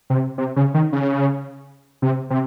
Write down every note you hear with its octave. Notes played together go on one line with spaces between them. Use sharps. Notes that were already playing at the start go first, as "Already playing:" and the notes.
C3
C3
C#3
D#3
C#3
C3
C3